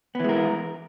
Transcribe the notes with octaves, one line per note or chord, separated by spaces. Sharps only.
E3 G#3 B3 A#4